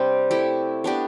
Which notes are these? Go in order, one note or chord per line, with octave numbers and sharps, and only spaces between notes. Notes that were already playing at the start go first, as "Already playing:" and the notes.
Already playing: C3 G3 C4 D4 G4
A3 E4 G4
B3 D4 G4